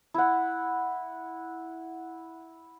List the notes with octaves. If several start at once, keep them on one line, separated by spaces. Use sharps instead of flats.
E4 F#5